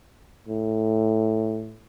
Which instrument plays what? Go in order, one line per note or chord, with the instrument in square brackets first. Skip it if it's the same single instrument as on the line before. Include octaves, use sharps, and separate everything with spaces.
[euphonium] A2